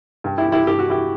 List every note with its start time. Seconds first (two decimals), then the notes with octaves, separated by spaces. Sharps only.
0.24 G2
0.38 E4 G4
0.45 E3
0.52 E4 G4
0.67 G2 G4
0.79 F#4
0.88 E3 E4 G4